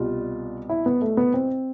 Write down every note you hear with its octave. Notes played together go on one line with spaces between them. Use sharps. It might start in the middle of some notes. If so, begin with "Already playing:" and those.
Already playing: C2 B2 G3 F4
E4
B3
A3
B3
C4